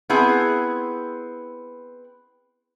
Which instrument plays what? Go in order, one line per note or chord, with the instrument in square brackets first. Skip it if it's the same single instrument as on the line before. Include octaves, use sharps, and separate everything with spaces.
[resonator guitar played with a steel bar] B3 C4 E4 G#4